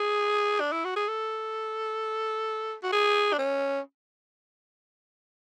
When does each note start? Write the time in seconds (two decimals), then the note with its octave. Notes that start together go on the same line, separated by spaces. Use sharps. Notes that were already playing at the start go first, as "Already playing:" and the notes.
Already playing: G#4
0.60 D4
0.72 E4
0.84 F#4
0.96 G#4
1.08 A4
2.83 F#4
2.92 G#4
3.33 D4
3.38 C#4